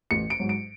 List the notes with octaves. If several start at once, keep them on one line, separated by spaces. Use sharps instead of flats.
A1 C#7
D7
G#2 F#3
D7